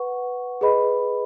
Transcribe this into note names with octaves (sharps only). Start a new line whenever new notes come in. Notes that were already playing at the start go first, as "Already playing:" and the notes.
Already playing: B4 F#5 C#6
G#4 B4 D#5 B5